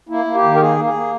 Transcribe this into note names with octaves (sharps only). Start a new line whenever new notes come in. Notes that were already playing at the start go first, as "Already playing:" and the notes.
A#3 E4
A#3
G4
D#3
A#4
A#3 G#4
A#3
G#4
A#3